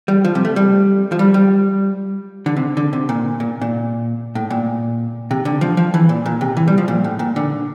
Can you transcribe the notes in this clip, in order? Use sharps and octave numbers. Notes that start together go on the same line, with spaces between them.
G3
F3
C3
A3
G3
F3
G3
G3
D3
C3
D3
C3
A#2
A#2
A#2
A2
A#2
C3
D3
F3
F3
E3
A#2
A#2
C3
E3
G3
F3
A#2
A2
A#2
D3